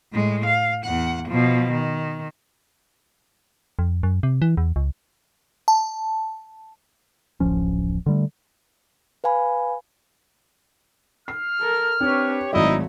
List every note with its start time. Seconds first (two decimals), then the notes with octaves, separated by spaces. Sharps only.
0.12 A2 G#3
0.46 F5
0.85 E2 F#5
1.29 B2 F3
1.72 D#3
3.79 F2
4.03 F#2
4.23 C3
4.42 E3
4.57 E2
4.76 C#2
5.68 A5
7.40 D1 A1 F3 C#4
8.06 D3 G3 A3
9.24 B4 F5 G#5 B5
11.28 F6 C7
11.59 A4 A#4
12.00 C4 D4 G4 B4 C#5
12.53 G#1 F#3 A3 D#4 E4 D5 D#5